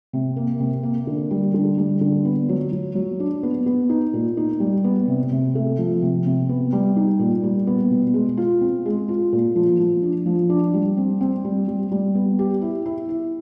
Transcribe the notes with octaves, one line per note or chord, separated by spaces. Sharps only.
C3
A#3
C3
A#3
D3
G3
D3
G3
D3
B3
F#3
F#3
F#3
D4
B3
B3
D#4
A#2
D#4
G3
B3
C3
C3
A3
F3
C3
C3
B3
G3
D#4
A#2
G3
B3
B2
G#3
F4
C4
G#3
F4
A#2
F3
F3
D4
F3
D4
G3
C4
C4
G3
G3
G3
B3
G4
E4
E4
E4